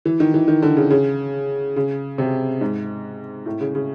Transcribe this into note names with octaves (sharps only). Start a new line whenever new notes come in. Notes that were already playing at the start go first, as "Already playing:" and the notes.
E3
D#3
E3
D#3
D3
C#3
C#3
C#3
C3
G#2
A2
C#3
C#3